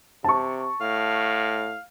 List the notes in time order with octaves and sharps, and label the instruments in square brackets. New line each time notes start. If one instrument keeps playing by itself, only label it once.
[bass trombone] C3 [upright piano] A5 C#6
[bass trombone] A2 [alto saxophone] F5